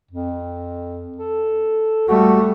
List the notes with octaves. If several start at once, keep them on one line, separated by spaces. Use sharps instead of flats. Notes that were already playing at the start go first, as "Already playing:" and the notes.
F2
A4
G3 A3 F#4